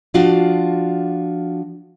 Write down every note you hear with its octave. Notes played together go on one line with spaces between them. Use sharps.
F3 D4 F4 F#4